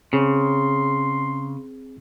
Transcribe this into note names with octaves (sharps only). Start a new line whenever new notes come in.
C#3 C4 G#4 C6